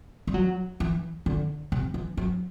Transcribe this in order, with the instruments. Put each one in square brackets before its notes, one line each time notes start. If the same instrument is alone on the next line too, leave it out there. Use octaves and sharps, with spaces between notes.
[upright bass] G3
F#3
E3
D3
C3
E3
F#3